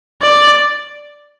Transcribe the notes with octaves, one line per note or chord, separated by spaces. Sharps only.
D5